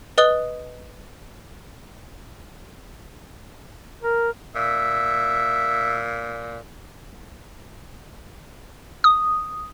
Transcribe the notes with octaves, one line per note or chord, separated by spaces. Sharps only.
B4 D#5 D#6 F#6 G7
A#4
A#2 E5
D#6